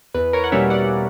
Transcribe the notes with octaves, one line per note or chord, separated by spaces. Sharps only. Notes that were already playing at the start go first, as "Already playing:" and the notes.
E2 B4
A#4 C#5
F#5
B2 G3 A#3 C#4 C#5 E5
D5 F#5